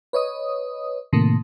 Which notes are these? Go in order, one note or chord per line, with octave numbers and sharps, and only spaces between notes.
B4 C#5 D#5 D#6
A2 C3 D#3 A3 A#3